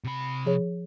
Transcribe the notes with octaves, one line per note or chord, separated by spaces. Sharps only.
C3 B5
F3 G#4 C#5